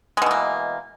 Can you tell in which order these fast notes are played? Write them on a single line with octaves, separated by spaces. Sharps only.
G#3 B2 E3 A#3